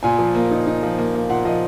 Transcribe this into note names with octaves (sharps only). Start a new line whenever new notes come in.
A#2 G#5
F3
A#3
D#4
D#4
F3
A#3
A#3
A#2 F#5
F3 D#5